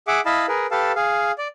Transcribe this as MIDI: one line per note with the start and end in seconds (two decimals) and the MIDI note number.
0.07 0.21 68
0.07 0.21 76
0.07 0.21 78
0.07 0.21 86
0.26 0.46 64
0.26 0.46 75
0.26 0.46 77
0.26 0.46 81
0.26 0.46 83
0.48 0.67 68
0.48 0.67 70
0.48 0.67 71
0.71 0.92 67
0.71 0.92 69
0.71 0.92 71
0.71 0.92 77
0.71 0.92 81
0.96 1.32 68
0.96 1.32 77
1.38 1.48 74